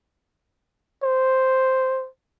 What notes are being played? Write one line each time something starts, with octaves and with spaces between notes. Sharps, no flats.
C5